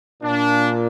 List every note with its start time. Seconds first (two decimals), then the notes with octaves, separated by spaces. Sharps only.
0.23 A#2 D4